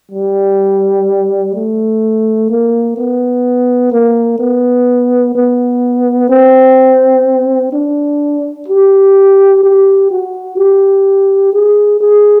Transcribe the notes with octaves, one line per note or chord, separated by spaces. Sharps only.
G3
A3
A#3
B3
A#3
B3
B3
C4
D4
G4
G4
F#4
G4
G#4
G#4